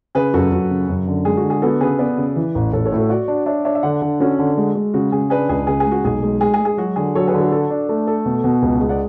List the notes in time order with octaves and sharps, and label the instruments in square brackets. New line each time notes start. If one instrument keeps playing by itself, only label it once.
[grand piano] C#3 [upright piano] G#4 B4
[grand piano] F#2 [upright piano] F#4 A4
[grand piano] F#2 [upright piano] F#4
[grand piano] C#3
F#2
D3
[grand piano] G#3 [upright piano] G#4
[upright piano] F#4
[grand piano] D3
[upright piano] G#4
[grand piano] B3 [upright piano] F#4 A4
[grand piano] C#3 [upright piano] G#4 B4
[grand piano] B3 [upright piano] B4 D5
[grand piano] C#3
E3
A1
[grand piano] A1 [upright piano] A4 C#5
[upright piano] A4 C#5
[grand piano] A2
[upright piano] F#4 A4
[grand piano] F#4 [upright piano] D5 F#5
[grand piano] D4
[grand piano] D4 [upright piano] C#5 E5
[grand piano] D4 [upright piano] C#5 E5
[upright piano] E5
[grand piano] D3 [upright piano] D5 F#5
[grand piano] D3
[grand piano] C#4 [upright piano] F#4 A4
[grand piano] D3
G#3
G#3
[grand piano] C#3 [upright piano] F#4
[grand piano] C#3 [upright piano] G#4
[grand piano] D4 [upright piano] G#4 B4
[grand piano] C#2 [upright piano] G#4
[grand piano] C#3 [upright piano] G#4
[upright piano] G#4
[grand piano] G#3
[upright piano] F#4
[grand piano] B1 [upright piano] G#4
[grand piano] G#3
[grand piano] G#3 [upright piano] G#4
[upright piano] G#4
[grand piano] G#3
[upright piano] G#4
[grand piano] F#3 [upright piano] F#4
[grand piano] D3 [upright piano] G#4
[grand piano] F#3 [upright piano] A4 C#5
[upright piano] G#4 B4
[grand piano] D3
[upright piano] F#4 A4
[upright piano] F#4 [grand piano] A4
[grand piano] D4
A3
A4
B2
B2
[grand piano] C#2 [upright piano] G#4
[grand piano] G#3
[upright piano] D5 F#5